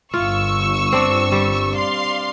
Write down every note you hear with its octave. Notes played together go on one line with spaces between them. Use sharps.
G1 F4 C#6 E6
C4 D4
G3
D5 F5 C6